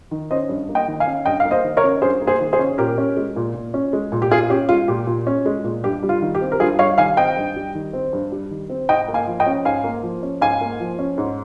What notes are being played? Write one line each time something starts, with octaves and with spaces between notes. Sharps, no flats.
D#3
C#4 C5 D#5
G2
A#3
D#5 G5
D#3
F5 G#5
C#4
G2 D#5 G5
F5
A#3
C5 D#5
D#3
A#4 C#5
C#4
G2 G#4 C5
A#3
G#4 C5
D#3
G#4 C5
C#4
A#2 G4 A#4
C#4
G#3
A#2
A#2
C#4
G#3
A#2
G4
A#2 F4 G#4
C#4 G4
G#3 F4
A#2 G4
A#2
C#4
G#3
A#2
G2 G4
G3
F4
D#3
G4
C4
A#4
G2 F4 G#4
G3 C#5 F5
D#3 F5 G#5
C4 D#5 G5
G2
G3
D#3
C4
G2
G3
D#3
C4
G#2 D#5 G5
A#3
F5 G#5
F3
D#5 G5
C#4
G#2 F5 G#5
A#3
F3
C#4
G#2 F5 G#5
A#3
F3
C#4
G#2